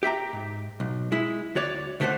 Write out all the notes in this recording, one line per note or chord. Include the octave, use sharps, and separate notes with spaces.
G4 E5 G5 A#5
G#2
B1
G#3 E4
D2 F#4 C#5 D5
C#2 D3 A3 C#4 C5 F#5